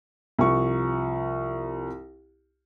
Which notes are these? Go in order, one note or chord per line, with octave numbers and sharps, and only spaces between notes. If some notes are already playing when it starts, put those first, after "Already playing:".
C2 F3 C#6